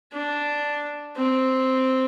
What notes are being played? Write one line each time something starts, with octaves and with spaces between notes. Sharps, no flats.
D4
C4